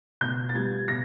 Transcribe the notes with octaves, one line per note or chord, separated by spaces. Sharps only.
B2 G6
A6
G3 B3 G#6
B2 A#6